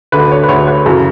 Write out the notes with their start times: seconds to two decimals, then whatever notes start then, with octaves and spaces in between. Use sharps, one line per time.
0.12 D2 D3 B4
0.32 C#5
0.43 B4
0.49 D2 D3 C#5
0.68 B4
0.86 F#2 C#3 E3 A4